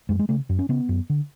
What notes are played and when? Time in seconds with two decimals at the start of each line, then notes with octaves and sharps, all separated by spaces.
0.09 F#2 G#3
0.19 G#3
0.29 C#3 A3
0.49 F#2
0.59 C#4
0.69 C#3 B3
0.89 F#2
1.10 D3